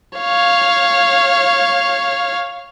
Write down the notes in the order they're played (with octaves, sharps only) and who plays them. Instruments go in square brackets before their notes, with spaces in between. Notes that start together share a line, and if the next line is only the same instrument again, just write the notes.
[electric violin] C#5 F5